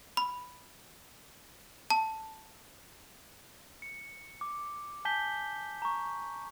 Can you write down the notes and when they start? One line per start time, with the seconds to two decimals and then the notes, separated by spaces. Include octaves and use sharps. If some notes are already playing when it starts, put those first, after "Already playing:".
0.17 B5
1.90 A5
3.82 C#7
4.41 D6
5.05 G#5 A5 G6 B6 G7
5.82 A#5 C#6